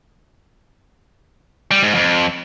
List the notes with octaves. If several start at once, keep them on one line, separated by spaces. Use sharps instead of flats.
G3
G#2
F2